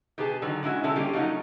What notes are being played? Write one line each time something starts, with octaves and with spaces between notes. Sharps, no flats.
B2 G4 G#4 B4 A5
D3 D#3 F#3
G3 G#3 C#4 E4 F#4
B2 D3 G#3 C#4 E4 A4
G3 A#3 C#4 D4 G4
F3 F#3 A3 C#4 D#4 F#4